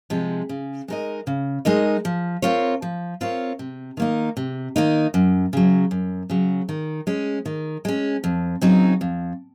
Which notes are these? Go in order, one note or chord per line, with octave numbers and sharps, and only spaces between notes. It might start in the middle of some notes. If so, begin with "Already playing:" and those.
C3 F3 G#3
C#3
G#3 D#4 A#4 D#5
C#3
G#3 D#4 A#4 D#5
F3
C4 F4 A#4 C#5
F3
C4 F4 A#4 C#5
C3
D#3 A#3 D#4
C3
D#3 A#3 D#4
F#2
C#3 F#3
F#2
C#3 F#3
D#3
G#3 C#4
D#3
G#3 C#4
F2
C#3 F#3 C4 D#4
F2